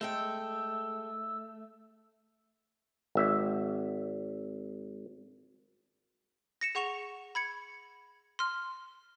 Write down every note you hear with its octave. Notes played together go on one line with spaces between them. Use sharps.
G#3 A3 A4 G5 E6
G#1 E5
A#6 C#7 E7
G#4 F#5 C#6 E7 F7
B5 G#6 C#7
C6 F6